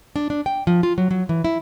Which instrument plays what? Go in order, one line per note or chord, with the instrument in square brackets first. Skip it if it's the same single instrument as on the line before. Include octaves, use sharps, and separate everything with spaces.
[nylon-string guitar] D4
D4
G5
F3
F4
F#3
F#3
E3
E4